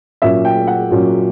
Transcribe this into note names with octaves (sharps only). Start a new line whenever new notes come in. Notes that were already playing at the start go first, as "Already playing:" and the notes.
A#2 F#3 C#4 E5
G5
F#5
A#2 F#3 C#4